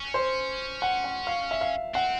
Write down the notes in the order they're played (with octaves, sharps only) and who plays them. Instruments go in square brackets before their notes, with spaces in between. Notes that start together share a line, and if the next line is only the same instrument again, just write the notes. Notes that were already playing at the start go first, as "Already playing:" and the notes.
Already playing: [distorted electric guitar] C#4
[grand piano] C5
F#5
F#5
F5
E5
F5
[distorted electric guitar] C4 [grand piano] F#5